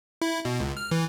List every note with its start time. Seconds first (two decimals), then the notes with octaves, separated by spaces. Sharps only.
0.22 E4
0.45 B2
0.60 C#2
0.77 F6
0.91 E3